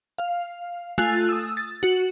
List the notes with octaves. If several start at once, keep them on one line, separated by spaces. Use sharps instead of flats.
F5
A3 F4 G#5 F#6 A6
D#6 E6
A6
F#4